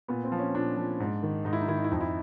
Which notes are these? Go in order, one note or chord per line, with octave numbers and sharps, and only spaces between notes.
A#2 B3
C4
F3
C#4
A#2 D4
F3
G#2
D#3
G#2 D#4
E4
D#4
D#3 E4
D#4
E4
F2 D#4
E4